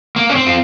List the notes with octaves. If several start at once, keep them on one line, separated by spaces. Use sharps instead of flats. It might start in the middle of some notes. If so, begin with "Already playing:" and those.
A#3
C#4
C4
F4